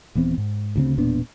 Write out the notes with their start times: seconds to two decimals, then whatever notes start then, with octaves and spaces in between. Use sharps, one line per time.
0.15 D#1 E3 B3 C4
0.38 G#2
0.76 D2 C#3 C4
0.98 E1 A#2 B3 D4